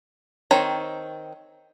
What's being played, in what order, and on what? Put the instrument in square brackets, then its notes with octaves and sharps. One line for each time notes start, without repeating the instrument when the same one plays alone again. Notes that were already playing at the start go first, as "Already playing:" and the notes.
[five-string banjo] D#3 C4 C#5 A#5